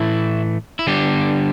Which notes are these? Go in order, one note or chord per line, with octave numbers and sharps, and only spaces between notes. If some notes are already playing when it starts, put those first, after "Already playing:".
Already playing: A2 E3 A3 E4
E4
D3 G3 B3 D4 G4